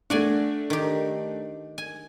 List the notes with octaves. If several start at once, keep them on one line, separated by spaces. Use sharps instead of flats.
A3 D4 F#4 D5 G#5
D#3 G4
G#5